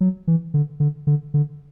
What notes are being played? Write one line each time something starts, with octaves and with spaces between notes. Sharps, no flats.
F#3
E3
D3
D3
D3
D3